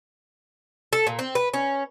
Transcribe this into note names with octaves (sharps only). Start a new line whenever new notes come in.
A4
A#2
C4
B4
C#4